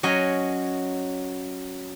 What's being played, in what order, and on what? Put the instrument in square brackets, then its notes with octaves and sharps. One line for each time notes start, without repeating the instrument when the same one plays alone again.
[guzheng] F#3 C#4 D#5 G#5